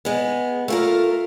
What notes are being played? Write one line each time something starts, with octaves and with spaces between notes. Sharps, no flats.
G#3 B3
A3 F4 A#4